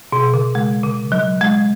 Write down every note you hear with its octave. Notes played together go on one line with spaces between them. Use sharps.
B2
C#3
G#3
C#3
F#3
G#3